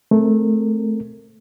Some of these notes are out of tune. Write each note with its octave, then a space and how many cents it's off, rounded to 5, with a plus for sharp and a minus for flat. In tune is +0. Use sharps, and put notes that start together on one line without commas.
A3 -15 C4 +0 A#4 -25